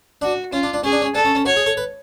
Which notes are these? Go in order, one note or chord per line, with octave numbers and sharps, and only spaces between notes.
D4 F#4
C#4 F4
D4
D4
C#4 G#4
D4
C#4
D4 A4
C#4
C#4
F#4 C#5
G#4
A4
B4